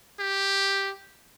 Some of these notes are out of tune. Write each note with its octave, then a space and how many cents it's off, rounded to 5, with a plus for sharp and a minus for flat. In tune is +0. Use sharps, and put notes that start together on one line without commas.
G4 +0